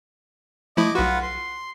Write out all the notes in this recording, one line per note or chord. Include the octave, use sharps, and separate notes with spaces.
F3 A3 E4 D#5 D6
B1 F4 F#4 B4 F#5
C6